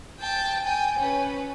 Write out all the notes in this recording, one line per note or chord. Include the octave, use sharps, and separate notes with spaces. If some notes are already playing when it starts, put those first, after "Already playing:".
G5 A5
G5 G#5
C#4 B4